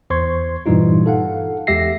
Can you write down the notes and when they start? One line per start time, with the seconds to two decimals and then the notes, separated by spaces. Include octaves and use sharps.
0.10 E2 C5 C6 C#6 G#6
0.66 G2 A#2 E3 G3 D#4 F4
1.06 A4 F5 F#5
1.67 E2 G#3 G4 E5 A#6 C7